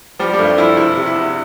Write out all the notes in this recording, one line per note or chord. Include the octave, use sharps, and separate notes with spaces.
F3 G3
G3
G2 A3
F3 E4
C3 E4
C3
E4
E2